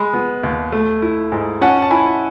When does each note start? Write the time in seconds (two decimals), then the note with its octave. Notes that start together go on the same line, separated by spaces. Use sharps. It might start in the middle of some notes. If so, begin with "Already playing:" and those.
Already playing: G#3 B5
0.13 B3
0.43 D#2
0.72 A3
1.02 E4
1.32 G#2
1.61 C#4 F#5 A5
1.82 A5
1.91 E4 G#5 B5